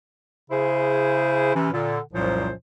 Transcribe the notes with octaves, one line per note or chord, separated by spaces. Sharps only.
C#3 E4 G#4 C5
C3 E3 C#4
A#2 D3
C2 F#2 A#2 F3 F#3 C5